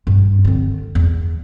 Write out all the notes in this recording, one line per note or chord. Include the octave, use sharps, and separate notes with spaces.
G2
D3 C4
E2